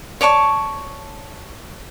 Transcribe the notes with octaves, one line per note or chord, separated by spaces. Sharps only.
C#5 D5 A5 C#6